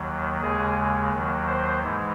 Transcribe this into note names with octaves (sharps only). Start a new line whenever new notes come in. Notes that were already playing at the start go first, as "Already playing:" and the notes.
Already playing: D#2 D#3 F#3
D#2 C#3 G#3 G#4
D#2 D#3 F#3
C5
G#2 E3 G#3